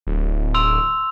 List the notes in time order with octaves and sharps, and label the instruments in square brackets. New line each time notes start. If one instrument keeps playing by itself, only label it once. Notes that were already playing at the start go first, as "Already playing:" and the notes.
[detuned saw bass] D1
[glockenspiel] C6 E6 F7